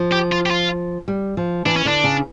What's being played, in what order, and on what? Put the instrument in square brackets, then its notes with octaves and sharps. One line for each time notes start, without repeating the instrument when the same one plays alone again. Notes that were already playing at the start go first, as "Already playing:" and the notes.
Already playing: [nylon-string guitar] F3
[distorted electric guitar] G4
F4
G4
F4
[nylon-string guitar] G3
F3
[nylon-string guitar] E3 [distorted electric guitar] D4
[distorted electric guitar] C#4
[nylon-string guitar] D3 [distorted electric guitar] D4
[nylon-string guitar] C#3